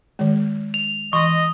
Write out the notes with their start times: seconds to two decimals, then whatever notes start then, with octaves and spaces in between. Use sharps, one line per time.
0.19 D#3 G#3
0.74 F7
1.13 E3 D#5 C6 C#6